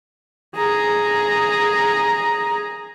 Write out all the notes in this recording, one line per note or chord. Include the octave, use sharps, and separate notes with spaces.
G#4 A#5